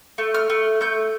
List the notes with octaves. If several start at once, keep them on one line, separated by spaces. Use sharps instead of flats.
A3
F6
A3
A3 G6